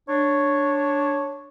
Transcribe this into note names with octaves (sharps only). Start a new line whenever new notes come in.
D4 C#5